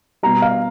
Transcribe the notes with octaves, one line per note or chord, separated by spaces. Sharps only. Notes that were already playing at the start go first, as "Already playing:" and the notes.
B2 G3 A#5
F5